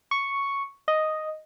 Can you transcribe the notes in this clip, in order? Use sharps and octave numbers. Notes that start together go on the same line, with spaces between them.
C#6
D#5